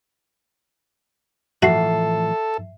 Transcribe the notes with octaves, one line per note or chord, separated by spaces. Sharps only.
A2 E3 F3 F#4 A4 E5 C7